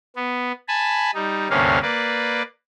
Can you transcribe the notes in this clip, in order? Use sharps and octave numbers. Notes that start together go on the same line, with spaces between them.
B3
G#5 A5 B5
G3 D#4
D2 G2 C3 A#3 C#4 F5
A#3 B4 D5